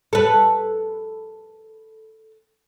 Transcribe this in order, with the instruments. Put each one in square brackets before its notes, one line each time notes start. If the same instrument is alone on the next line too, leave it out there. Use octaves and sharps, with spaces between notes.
[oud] A4 B4